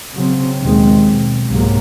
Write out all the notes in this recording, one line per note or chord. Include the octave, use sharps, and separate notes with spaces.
C#3 F#3 C4
D#2 B2 D#3 G#3 C4
B1
C2 G#2 C3 F#3 A#3